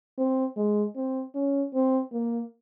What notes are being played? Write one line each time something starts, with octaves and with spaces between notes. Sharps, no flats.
C4
G#3
C4
C#4
C4
A#3